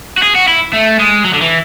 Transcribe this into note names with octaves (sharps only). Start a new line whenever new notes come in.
F#4
G#4
F#4
E4
A3
G#3
F#3
D3
E3